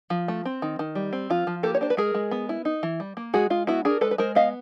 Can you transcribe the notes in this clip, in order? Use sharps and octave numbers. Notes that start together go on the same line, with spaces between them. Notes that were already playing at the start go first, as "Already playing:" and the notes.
F3
A3
C4
D#3
D#3
G3
C4
F3 F4
F3
A#3 G4 A4
C#5
D4 C5
B4
G#3 G#4 A#4
G#3
B3
E4
D#4
E3
G3
A#3
G#3 F#4 G#4
G#3 F4
B3 E4 F#4
D4 G#4 A#4
G#3 A4 B4
B4
G#3 A#4 C5
B3 D#5 F5